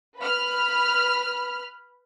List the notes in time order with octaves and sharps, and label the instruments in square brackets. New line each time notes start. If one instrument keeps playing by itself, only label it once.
[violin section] B4 B5 F6